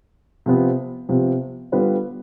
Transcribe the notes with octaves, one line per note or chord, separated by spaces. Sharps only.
C3 F3 B3
C3 F3 B3
D3 G3 B3 F4 B4